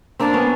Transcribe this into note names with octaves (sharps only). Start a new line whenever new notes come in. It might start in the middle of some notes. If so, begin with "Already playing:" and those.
A#3 C4 D4
B3 C#4